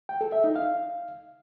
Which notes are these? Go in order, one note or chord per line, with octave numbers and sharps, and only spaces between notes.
G5
A4
E5
D#4
F5